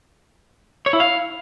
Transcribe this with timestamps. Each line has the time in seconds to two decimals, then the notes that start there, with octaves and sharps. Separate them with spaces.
0.86 C#5
0.93 E4
1.00 F5